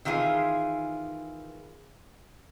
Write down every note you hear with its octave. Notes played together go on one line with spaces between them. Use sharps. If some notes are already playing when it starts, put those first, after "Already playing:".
D#3 E3 F4 G#4